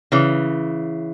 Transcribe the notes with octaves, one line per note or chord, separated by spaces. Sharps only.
C#3 E3